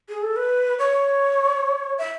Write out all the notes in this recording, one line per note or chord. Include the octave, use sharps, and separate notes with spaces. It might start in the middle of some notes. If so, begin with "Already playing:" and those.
G#4
A4
B4
C#5
E5